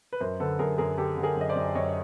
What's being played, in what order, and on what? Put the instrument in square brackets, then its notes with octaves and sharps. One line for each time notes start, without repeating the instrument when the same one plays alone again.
[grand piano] B4
F#2 A#4 C5
D3 A4 B4
F#2 G#4 A#4
F#2 G#4 A#4
D3 G4 A4
D3
G#4 A#4
F#2 D#5
C5 D5
F#2
F#2 C#5 D#5